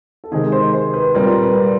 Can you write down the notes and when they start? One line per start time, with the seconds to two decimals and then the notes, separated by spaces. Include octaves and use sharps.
0.24 A4
0.32 C3 D#3 G#3 C4 G#4
0.52 C5
0.73 C5
0.94 B4
1.14 A#2 G3 C4 A#4
1.43 B4